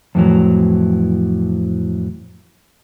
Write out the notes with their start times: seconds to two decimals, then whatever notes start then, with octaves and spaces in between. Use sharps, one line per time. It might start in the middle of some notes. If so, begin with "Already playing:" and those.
0.15 F2 A2 E3 F#3